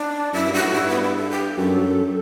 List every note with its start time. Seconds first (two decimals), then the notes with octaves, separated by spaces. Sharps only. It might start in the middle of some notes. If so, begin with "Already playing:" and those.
Already playing: D4
0.33 F#2 E4
0.46 G2
0.54 F#4
0.60 A2
0.74 G2 E4
0.89 B3
1.03 E4
1.16 A4
1.30 G4
1.57 F#2 A4
1.78 F#2